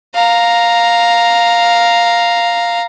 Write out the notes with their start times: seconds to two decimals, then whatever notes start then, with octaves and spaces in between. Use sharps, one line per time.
0.15 F5 A#5